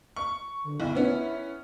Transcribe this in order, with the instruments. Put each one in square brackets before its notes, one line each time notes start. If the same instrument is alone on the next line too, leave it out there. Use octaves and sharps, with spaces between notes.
[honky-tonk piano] C#6
[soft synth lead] D3
[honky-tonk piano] B1 [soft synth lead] E4
[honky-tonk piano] B3 C#4